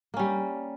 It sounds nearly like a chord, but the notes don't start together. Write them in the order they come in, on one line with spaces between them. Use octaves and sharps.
A#3 C#4 G3